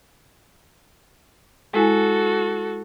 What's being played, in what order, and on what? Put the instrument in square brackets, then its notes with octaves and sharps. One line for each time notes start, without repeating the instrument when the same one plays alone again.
[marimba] G#3 E4 G#5 [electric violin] F#4 A4